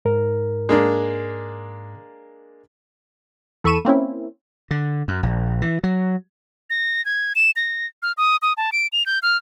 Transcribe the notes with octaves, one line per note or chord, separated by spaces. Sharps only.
G#2 A#4
G#3 A#3 D4
E2 A4 B5 C#6 D#7 E7
A#3 C4 C#4 E4
D3
F#2
A#1
E3
F#3
A#6
G#6
E7
A#6
F6
D#6
D#6
A5
D7
F7
G6
F6